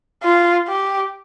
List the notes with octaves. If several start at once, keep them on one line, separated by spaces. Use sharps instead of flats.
F4
G4